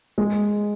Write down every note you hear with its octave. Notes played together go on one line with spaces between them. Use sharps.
G#3